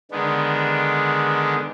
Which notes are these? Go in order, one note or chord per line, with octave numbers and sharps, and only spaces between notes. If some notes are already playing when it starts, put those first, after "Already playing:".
D3 D#3 G#3 B3 D4